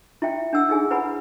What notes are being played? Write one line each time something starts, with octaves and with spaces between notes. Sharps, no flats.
E4 F4 E5 G5
D4 F#5 E6
D#4 F4 G#4 G#5
E4 B4 F#5 G#5 B5